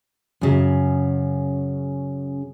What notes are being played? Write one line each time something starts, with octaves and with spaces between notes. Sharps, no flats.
F#2 C#3